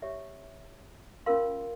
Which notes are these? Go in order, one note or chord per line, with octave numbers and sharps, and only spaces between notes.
G4 C#5 E5
C#4 F4 A#4 F5 C6